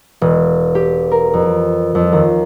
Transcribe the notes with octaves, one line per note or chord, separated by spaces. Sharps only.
E1
G4
A#4
F2
F2
D#2